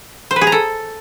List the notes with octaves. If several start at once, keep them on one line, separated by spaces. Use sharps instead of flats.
C5
B4
G#4
A#5
A4